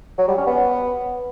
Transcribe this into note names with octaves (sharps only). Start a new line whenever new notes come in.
F#3
G3
C#4
B3